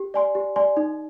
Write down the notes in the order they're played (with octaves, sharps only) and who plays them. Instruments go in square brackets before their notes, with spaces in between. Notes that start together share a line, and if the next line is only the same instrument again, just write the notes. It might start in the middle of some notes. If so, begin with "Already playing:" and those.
Already playing: [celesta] G4
D5 G#5 C6
G4
D5 G#5 C6
D#4